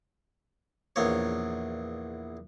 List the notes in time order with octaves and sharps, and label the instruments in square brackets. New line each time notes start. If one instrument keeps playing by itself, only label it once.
[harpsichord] A#1 E2 A#3 C#5